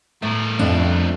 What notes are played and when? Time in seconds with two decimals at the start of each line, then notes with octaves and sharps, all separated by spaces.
0.22 A2 A3 A#4
0.59 F2 D4